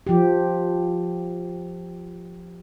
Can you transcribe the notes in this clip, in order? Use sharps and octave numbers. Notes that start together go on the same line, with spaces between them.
F3 G4